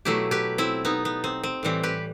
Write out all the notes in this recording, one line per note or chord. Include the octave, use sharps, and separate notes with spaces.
B2 F#3 A3 E4 G4
G4 B4
C4 E4
B3 D#4
B3
C4
C4
A2 E3 G3 C4
G4 B4